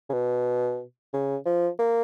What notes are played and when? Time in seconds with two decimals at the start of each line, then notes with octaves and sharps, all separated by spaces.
0.09 C#3
0.13 B2
1.13 C#3
1.45 F3
1.79 A#3